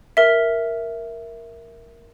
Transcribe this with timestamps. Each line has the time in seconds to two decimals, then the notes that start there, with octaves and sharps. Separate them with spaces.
0.17 A#4 E5